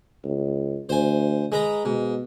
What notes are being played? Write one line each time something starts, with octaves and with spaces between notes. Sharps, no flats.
C#2
D2 C5 G#5
G#3 B4 A#5
G#2 B2